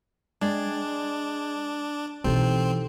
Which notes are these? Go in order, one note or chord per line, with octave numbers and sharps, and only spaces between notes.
G#3 D4 D5 G5
B2 E3 C4 D#4 G4 A4